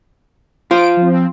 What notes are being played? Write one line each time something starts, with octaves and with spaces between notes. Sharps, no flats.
F4 C5 D7
F3 C4